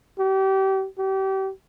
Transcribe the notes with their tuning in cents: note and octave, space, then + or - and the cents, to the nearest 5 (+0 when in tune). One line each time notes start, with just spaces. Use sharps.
G4 -30
G4 -30